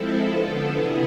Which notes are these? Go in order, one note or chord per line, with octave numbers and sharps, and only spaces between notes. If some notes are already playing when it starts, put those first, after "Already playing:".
Already playing: F3 G#3 C4 E4 A4
D3 F3 B3 D4
C3 E3 B3 E4 G#4